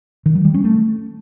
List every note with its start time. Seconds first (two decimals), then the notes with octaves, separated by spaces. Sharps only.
0.26 D#3
0.35 F#3
0.45 G3
0.54 C#4
0.64 A3